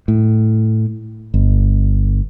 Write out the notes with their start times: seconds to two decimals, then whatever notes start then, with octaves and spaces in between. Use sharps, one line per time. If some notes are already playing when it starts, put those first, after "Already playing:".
0.08 A2
1.34 G1